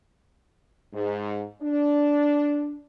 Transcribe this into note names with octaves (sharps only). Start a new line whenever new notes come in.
G#2
D4